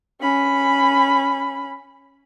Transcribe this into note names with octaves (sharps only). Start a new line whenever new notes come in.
C#4 B5